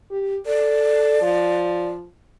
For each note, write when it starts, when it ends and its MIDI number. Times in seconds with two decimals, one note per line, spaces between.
0.11 0.37 67
0.46 1.21 69
0.46 1.89 74
1.22 2.06 53